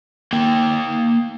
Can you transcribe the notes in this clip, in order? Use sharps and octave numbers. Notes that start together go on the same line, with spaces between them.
A#3 G5